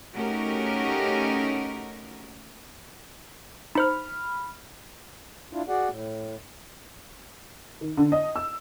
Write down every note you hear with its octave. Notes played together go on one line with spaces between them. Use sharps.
A3 C#4 D#4 F#4 G4 A#4
D#4 C5 B5 F6
D4 E4 F4
F#4 G#4 D5 F#5
A2
D#3
D3
D#5
E6